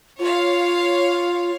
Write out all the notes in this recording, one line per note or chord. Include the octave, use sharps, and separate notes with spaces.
F4 C#5 F5